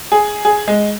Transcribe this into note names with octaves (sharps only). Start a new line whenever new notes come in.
G#4
G#4
G#3